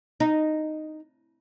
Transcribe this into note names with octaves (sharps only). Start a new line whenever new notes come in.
D#4